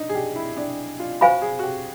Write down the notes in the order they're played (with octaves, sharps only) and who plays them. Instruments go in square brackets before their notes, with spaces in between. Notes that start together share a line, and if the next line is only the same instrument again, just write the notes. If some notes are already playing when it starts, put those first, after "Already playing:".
Already playing: [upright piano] D4 D#4
G#4
G4
E4
D4
F4
[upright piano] F#4 [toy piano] C5 F5 G#5 B5
[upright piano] G#4
F#4
G4